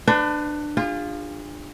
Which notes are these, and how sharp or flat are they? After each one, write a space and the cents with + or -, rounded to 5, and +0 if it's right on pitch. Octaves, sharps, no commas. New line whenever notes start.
D4 +20 B4 +35
F4 +0 G#4 -45